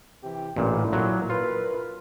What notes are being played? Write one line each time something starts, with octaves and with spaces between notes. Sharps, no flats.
C3 E3 G4
A1 A#2 D4 E4
A#2 F#3
F4 A#4 B4